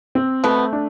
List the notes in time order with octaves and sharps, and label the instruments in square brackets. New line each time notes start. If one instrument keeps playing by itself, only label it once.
[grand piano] C4
[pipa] B2 B3 [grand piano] A3
[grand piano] D4